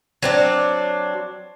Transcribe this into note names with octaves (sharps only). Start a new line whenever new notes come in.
F#3 C4 D4